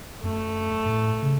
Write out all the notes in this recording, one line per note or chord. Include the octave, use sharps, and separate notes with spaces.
F#2 A3
G#2
A2
C#3